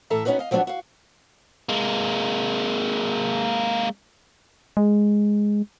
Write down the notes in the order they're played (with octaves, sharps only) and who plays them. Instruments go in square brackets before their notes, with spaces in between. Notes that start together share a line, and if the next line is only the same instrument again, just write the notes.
[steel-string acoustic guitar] A2 E3 A4 E5 A5 A#5
B3 C#4 D#4 F#4 B4
D#5 F5
F3 F#3 B3 C4 D4 F#4
F#4 F5
[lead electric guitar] G#3 A#3
[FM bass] G#3